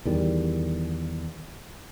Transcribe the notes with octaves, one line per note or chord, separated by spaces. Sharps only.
E2 D#3 G3